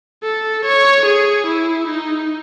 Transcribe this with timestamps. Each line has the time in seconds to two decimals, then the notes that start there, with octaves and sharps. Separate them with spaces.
0.23 A4
0.65 C#5
1.06 G#4
1.47 E4
1.87 D#4